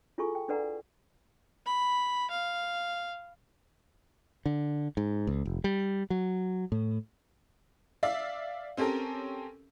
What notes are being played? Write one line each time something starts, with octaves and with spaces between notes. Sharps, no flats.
E4 F4 G#4 A4 G#5 C#6
G5
D4 A4 B4 D5 F#5 A#5
B5
F5
D3
G#2
C#2
F1
G3
F#3
A2
D5 E5 F5
C4 C#4 G4 A4 A#4